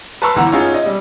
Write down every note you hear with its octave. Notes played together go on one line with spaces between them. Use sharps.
B4 A5 A#5 C6 C#6 E6
G1 E3 F#5 A#5
C#4 D#4 F4 G#4
D#5
G3